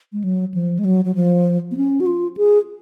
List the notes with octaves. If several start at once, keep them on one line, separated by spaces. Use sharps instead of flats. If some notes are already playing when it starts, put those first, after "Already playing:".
G#3
F#3
F3
G#3
F#3
F#3
F3
B3
C#4
F#4
F4
G#4